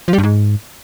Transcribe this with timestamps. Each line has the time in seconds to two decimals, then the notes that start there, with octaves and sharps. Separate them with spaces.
0.08 F3
0.13 G3
0.18 G2
0.23 G#2